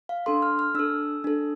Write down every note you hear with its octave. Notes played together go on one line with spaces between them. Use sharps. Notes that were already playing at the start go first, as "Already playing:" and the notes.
F5
D4 A4 C6
F6
F6
D4 A4 E6
D4 A4